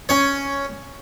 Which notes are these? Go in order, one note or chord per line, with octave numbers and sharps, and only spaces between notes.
C#4 C#5